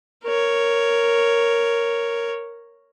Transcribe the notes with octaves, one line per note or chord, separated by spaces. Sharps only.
A#4 C#5